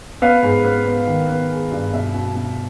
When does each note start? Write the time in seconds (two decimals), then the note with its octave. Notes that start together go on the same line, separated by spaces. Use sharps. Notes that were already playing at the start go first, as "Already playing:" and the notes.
0.22 B3 F5
0.43 G#2
0.65 B3
0.86 B3
1.07 D#3
1.28 B3
1.50 G#3
1.71 G2
1.93 B2 E5
2.14 B2
2.35 B2